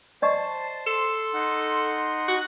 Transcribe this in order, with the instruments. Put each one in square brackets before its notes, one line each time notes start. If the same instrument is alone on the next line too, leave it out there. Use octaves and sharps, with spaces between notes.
[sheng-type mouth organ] C5 [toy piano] D5 D#5 C#6 [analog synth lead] A5
[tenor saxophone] A4 [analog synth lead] C6
[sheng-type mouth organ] D#4 F#5
[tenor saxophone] F#4 [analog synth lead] F#6